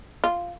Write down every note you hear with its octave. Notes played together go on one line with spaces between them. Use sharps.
F4